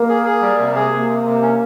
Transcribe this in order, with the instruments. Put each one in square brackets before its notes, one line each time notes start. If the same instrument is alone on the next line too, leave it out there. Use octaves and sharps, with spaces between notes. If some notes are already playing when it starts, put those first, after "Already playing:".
Already playing: [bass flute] A#3
[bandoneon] G#4
G#4
G3
C3
G#4
[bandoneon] C3 [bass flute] A#3
[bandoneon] C3
C3
C#4